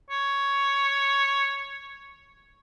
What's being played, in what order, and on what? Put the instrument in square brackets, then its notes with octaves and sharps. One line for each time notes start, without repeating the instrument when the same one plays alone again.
[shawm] C#5